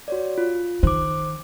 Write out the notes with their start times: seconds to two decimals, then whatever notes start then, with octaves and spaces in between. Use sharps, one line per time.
0.08 F#4 C#5 D5
0.38 F4
0.83 D#3 C5 D6